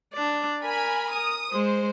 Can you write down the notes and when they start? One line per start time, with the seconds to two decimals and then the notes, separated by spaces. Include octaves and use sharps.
0.14 D4 D5
0.64 A#4 G#5 B5
1.11 D#6
1.53 G#3 C5